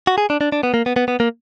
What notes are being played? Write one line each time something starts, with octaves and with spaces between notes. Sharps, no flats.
F#4
G#4
D4
D4
D4
B3
A#3
B3
B3
B3
A#3